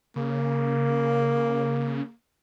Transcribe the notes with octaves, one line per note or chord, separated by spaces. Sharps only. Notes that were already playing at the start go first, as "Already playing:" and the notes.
C#3 A#3